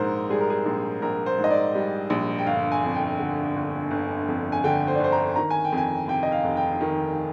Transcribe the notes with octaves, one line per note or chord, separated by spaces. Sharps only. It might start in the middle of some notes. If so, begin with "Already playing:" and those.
Already playing: A#1 G#2 A#4 C5
G3 G#4
A#4
G#4
A#1
A#1 A#4
C5
G#2
D#5
D5
G3
A#1
G5
G1 F5
G#5
F2
G5
D3
G1
G1
F2
G#5
D3 G5
C5
D5
G1 C5
A#5
D#3 A#5
G#5
G5
F2
G#5
C3 G5
D#5
F5
F1
G5
D#3